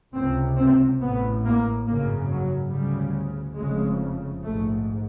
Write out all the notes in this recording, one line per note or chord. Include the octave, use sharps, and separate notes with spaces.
C#2 C3 C4
C4
A1 A2 B3
A#3
G#1 F#2 C#3 A#3
F#3
D2 C#3 G3
F1 F2 C#3 G#3
A#1 G#2 A3